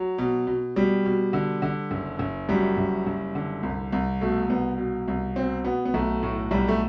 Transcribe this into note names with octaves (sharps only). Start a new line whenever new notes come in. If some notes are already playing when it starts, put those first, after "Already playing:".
Already playing: F#3
B2
B2
B2 G3
B2
D3
D3
F#1
F#1
F#2 G3
F#1
F#1
D3
C2
C2
B2 A3
C2 B3
B2
C2
B2 C4
B2 B3
B3
B1 A3
A2
B1 G3
A3